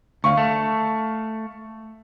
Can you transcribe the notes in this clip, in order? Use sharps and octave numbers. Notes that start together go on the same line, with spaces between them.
D2 F5 C#6
A3